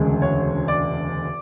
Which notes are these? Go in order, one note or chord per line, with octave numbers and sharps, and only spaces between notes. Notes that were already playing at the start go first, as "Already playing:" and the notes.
Already playing: E1 D2 C#3 G#3
C#5
D5